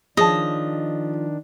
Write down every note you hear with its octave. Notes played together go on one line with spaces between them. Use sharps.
D#3 F3 D4 G#4 C#5 D#5 A5